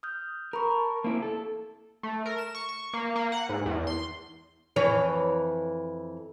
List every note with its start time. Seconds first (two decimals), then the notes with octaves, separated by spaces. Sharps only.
0.03 D#6 F6 G6
0.53 A#4 A#5 B5 C#6
0.72 A5
1.04 A#3 C4 E4
1.22 A4
2.03 A3
2.26 A#4
2.38 E7
2.55 C#6
2.69 C#6
2.93 A#3
3.16 A#3
3.32 F#5
3.49 G#2
3.66 E2
3.87 C6
4.76 F2 E3 C#5